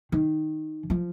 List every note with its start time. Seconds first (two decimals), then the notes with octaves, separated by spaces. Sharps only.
0.12 D#3
0.90 F3